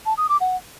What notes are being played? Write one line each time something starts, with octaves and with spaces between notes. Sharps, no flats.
A5
D#6
D6
F#5